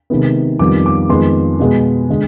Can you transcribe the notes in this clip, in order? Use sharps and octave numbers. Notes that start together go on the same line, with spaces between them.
C3 D#3 G#3 B3
F2 D#3 G3 B3 D6
D6
F2 D#3 G#3 B3 C6
B2 G#3 B3
D3 G#3